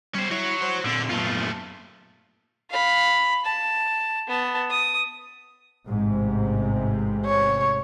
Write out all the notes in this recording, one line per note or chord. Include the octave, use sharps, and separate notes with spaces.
G3 C#4 C5
E4 F#4 C#5
C5
A#2 D3 C4 D4
F#2 A#2 A3 B3 F4
F5 B5
A5
B3 A5
D#6
A1 G#2 C3
C#5